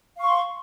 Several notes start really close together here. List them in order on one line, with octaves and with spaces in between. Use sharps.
F5 C#6 C6